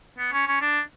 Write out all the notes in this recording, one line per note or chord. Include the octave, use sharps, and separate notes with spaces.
B3
C#4
C#4
D4